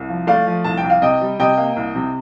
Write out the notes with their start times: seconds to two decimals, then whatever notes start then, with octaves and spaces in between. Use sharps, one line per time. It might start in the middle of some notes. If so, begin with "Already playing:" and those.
Already playing: C2
0.09 F3
0.27 A3 D5 F5
0.47 F3
0.64 C2 A5
0.77 G5
0.83 C2
0.90 F5
1.02 C3 D#5 G5
1.21 G3
1.39 C3 D#5 G5
1.58 A#3
1.76 C2
1.95 C3